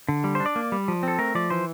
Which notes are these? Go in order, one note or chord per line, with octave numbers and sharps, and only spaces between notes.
D3
G3
C5
D4
D5
A#3
G3
F3
C4 A4
A3 A#4
F3 D5
E3 C5